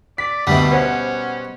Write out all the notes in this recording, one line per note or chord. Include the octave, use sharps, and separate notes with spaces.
D5 B6
D2 B2 G3 E5 B5
C#4 C5 F#5